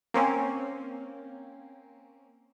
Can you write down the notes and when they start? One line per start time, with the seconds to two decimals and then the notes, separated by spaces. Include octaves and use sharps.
0.14 A#3 C4 C#4